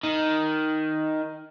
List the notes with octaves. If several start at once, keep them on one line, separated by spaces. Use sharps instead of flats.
D#3